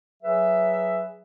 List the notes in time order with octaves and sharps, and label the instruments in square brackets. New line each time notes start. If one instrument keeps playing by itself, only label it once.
[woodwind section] F#3 G#4 B4 E5